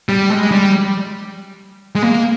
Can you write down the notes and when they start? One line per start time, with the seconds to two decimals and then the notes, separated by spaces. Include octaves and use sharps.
0.09 G3
0.30 G#3
0.51 G3
1.96 G#3
2.02 A#3